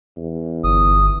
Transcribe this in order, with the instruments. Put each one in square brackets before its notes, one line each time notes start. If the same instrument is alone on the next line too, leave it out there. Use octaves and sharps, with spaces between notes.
[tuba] E2
[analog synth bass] G1 [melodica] D#6